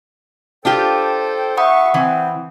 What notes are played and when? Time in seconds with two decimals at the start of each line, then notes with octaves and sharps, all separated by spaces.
0.65 D4 F4 G4 A4 C5 G5
1.57 E5 F#5 B5 C#6 D#6
1.94 E3 C4